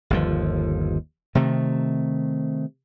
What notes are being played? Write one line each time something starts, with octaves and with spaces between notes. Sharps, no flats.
G1 D#2 F3
C3 D#3 A3